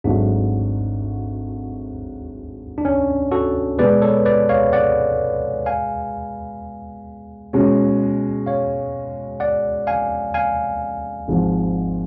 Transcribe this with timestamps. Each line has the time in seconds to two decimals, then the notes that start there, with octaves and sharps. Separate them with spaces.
0.04 G#1 G#2 F#3 A3 D4
2.78 D4
2.85 C#4
3.32 F#4 A4
3.79 B2 G#3 B3 B4 D5
4.02 A4 C#5
4.26 B4 D5
4.49 C#5 F5
4.73 D5 F#5
5.66 F5 G#5
7.53 B2 G#3 C#4 F#4
8.46 C#5 F5
9.40 D5 F#5
9.87 F5 G#5
10.34 F5 G#5
11.28 G#1 G#2 F3